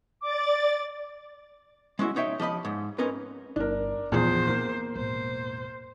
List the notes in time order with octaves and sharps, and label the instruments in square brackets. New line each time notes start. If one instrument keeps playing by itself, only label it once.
[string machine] D5 A6 [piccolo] D6
[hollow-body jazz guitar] G#3 C#4 E4 F#4
D#4 C#5 E5 G5
F3 G4 D#5 B5
G#2
C4 C#4 D#4 A#4 B4
[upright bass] G1 [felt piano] D4 A#4
[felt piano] E2 F3 G#4 [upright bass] A#2 C#3 [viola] C5
[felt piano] A#3 [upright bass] B3
[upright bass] E1 A2 [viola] C5